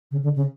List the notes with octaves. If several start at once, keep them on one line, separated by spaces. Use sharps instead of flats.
C#3
D3
C#3